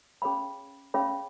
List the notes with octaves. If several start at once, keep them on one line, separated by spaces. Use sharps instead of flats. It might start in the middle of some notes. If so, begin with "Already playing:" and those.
C#4 G#4 C#5 F5 B5
C#4 G#4 C#5 F5 B5